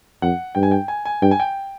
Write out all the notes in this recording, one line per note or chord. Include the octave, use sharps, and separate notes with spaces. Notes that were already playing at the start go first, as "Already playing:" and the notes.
F2 F#5
G2 G5
G#5
G5
G#5
G#5
G2 G5
G#5
G5